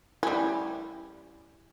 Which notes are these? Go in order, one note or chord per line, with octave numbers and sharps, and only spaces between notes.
G3 C#4 E4